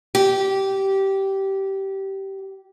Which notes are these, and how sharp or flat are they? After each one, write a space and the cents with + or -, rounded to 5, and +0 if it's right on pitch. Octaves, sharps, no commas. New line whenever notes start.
G4 -15